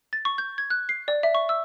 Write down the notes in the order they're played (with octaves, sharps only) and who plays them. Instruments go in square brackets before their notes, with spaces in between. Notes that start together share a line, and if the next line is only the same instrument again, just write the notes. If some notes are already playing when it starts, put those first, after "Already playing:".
[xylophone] A6
C#6
G6
G#6
F#6
C7
D5
E5
C#6
E6